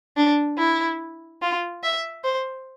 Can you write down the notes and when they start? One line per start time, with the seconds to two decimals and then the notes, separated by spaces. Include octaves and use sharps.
0.17 D4
0.58 E4
1.42 F4
1.84 E5
2.24 C5